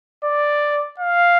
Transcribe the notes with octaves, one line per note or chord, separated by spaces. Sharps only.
D5
F5